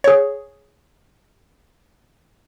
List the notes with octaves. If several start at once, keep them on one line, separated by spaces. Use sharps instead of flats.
G#4 C#5